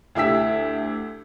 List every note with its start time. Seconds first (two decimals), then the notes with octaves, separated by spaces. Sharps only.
0.15 D2 E4 G4 E6 B6